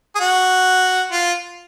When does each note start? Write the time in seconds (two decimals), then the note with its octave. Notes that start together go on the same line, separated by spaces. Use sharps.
0.15 G#4
0.20 F#4
1.12 F4